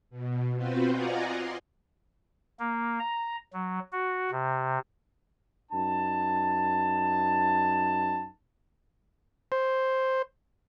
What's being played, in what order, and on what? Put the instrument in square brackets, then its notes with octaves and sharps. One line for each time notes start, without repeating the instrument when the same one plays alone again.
[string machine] B2
C4 F4 F#4 B4 C5
F4 D5 D#5 F#5 G#5 A#5
C6
[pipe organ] A#3
A#5
F#3
F#4
C3
[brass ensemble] F#2 D#4 A5
[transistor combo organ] C5